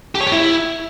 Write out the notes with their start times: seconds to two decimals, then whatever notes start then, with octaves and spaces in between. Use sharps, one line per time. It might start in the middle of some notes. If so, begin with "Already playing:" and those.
0.15 G4
0.21 C#5
0.26 G4
0.32 E4